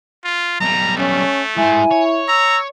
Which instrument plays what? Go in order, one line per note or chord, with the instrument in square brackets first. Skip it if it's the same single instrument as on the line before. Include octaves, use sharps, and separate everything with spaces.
[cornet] F4
[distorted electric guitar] B1 G3 [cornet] A#5
[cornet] A3 [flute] C#4
[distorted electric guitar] G#3 C5 [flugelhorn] E4 [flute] G#5
[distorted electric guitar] C#5
[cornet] A#5 [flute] E6